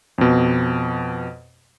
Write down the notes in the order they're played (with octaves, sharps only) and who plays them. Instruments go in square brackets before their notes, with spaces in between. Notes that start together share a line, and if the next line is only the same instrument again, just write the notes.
[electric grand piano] F2 B2